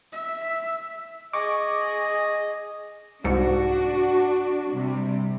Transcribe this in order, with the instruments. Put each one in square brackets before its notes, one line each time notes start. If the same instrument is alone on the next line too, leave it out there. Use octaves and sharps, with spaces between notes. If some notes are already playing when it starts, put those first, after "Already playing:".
[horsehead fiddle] E5
[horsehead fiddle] G#4 [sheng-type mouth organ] D#5 [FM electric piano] C#6 D6
[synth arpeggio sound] C2 G#2 C#7 [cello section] D4 F#4
[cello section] C3 G3